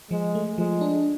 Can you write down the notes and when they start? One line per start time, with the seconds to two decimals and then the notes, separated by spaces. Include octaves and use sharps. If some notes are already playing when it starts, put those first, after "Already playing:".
0.10 F3 G#3
0.35 A3
0.58 F3 G#3
0.81 D4